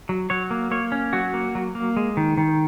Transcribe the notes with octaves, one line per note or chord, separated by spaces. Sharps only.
F#3
F#3 C#5
A#3
A#3 C#5
C#4
F#3 F#4
A#3
F#3
A#3
G#3
D#3
D#3